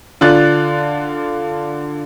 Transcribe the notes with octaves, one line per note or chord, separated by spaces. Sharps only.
D3 F4 D5 F#6 A6